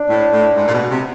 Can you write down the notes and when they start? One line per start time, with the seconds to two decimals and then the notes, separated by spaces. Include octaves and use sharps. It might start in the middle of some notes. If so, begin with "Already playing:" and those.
Already playing: D4
0.09 A2
0.33 A2
0.56 G#2
0.68 A#2
0.73 B2
0.90 C3